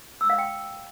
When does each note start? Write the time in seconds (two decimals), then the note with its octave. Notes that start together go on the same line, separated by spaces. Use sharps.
0.21 E6
0.30 F5
0.38 G5